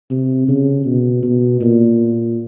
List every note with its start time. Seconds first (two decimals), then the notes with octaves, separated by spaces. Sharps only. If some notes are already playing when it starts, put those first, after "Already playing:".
0.11 C3
0.48 C#3
0.86 B2
1.23 B2
1.61 A#2